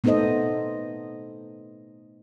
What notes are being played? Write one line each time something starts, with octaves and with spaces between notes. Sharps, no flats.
A3 B3 D#4 A4 C5 D#5